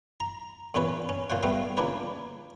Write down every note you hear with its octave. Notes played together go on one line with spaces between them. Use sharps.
A#5
E2 A#2 C#4 B4 C#5
C#4
A#2 F4 C5 C#5 F#5
G3 A3 B3 B4 F5
C#3 F3 A#3 D4 B4 C#5